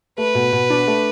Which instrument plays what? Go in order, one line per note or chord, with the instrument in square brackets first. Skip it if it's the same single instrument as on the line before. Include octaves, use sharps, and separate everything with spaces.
[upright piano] A3 [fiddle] B4
[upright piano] B2
B2
D4
A3